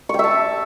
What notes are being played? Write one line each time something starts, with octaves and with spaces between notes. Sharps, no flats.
E5 G5 A5 C#6